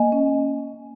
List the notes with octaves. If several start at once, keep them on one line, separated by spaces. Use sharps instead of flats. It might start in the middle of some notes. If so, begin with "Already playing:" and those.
Already playing: A#3 D#5 G#5
C#4